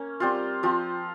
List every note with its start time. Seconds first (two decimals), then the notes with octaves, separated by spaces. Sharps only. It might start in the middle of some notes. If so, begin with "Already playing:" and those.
Already playing: A#3 C#4
0.20 G3 C4 F4
0.63 F3 C4 F4